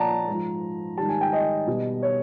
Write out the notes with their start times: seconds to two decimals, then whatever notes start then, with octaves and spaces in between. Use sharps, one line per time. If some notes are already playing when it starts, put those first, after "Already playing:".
Already playing: A#2 F3 D5 F#5 A5 A#5
0.28 G#2 F3
0.97 G#2 D#3 G3 A5
1.09 G#5
1.21 G5
1.33 D#5
1.67 B2 G3
2.03 C#5